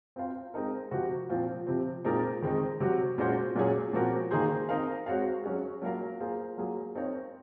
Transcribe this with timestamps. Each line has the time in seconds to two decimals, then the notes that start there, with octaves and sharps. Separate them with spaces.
0.16 C4 F4 C5 F5
0.54 G#3 C4 D#4 A#4
0.91 C3 F3 C4 F#4
1.29 A#2 F3 C4 F4
1.67 C3 F3 C4
2.04 A#2 G#3 C4 D#4 A#4
2.42 D#3 G#3 C4 D#4
2.80 C3 F#3 C4 F#4
3.18 A#2 G#3 C#4 F#4 C5
3.55 A#2 F#3 C#4 G#4 C#5
3.93 A#2 F3 C4 F#4 A#4
4.31 D#3 A#3 D#4 G#4 C5
4.69 C4 D#4 A#4 F5
5.06 G#3 C4 F#4 C#5 F5
5.44 F#3 C#4 G#4
5.82 F#3 A#3 F4 A#4 F5
6.20 A#3 F4 G#4 C5
6.57 F#3 A#3 F4 G#4
6.95 C4 D#4 A#4 C#5 F5